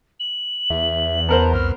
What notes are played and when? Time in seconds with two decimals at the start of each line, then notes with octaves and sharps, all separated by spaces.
0.20 F#7
0.70 E2 E5
1.29 B3 A#4 C5 A5 A#5
1.53 C2 F2 F6